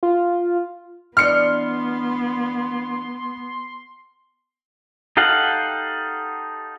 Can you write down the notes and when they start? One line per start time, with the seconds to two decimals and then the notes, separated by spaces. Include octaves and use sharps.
0.03 F4
1.17 E3 B3 D4 D#5 C6 F6 C#7
5.17 D#4 G4 A4 F5 F#5